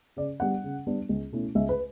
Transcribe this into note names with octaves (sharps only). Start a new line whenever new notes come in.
C#3 D5
G3 B3 D4 F#5
C#3
G3 B3 D4
C#2
B2 A3 C#4 E4
C#2 E5
B4